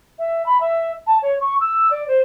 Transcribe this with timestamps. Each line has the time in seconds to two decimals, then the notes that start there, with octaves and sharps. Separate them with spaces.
0.19 E5
0.46 B5
0.60 E5
1.07 A5
1.22 C#5
1.41 C#6
1.60 E6
1.91 D5
2.08 C5